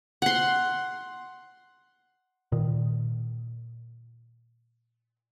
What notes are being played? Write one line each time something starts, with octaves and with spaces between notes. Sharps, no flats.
F#5 C6
A#2 D#3